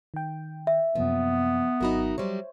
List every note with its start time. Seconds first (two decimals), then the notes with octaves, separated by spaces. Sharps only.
0.14 D#3 G5
0.67 E5
0.95 F#2 C3 F3 A#3 B3
1.80 G#1 F#3 D#4 F#4 A#4 B5
2.18 F#3 G3 C5 C#5